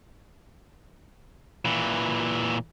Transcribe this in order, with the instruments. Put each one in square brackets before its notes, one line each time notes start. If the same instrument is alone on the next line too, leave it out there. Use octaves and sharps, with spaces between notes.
[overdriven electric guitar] A#2 E3